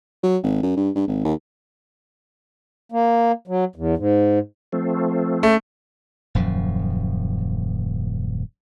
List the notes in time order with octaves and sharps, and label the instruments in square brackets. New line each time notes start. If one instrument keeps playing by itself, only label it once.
[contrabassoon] F#3
G#1
F#2
G2
G2
G#1
D#2
[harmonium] A#3
F#3
E2
G#2
[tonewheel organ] F3 A3 C4
[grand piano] A3 [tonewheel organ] C#4
[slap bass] D#1 F#2 F3